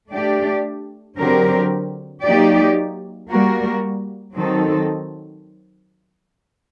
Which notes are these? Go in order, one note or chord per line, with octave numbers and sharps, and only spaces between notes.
A3 D4 G4 D5
D3 F#3 C4 G4 A#4
F#3 A#3 D#4 G4 D5
G3 A#3 F#4 A#4
D#3 F#3 C4 D#4 A4